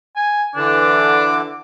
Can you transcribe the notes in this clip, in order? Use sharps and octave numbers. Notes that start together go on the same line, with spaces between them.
G#5
D3 E3 D4 D6